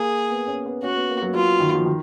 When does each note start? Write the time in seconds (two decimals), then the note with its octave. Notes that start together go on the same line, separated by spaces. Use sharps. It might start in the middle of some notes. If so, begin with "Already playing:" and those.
Already playing: A#3 G#4
0.31 B3
0.48 C#4
0.66 B3
0.83 C#4 F#4
0.96 B3
1.09 A#3
1.22 F#3
1.34 F#3 F4
1.60 D#3
1.75 F3
1.86 D#3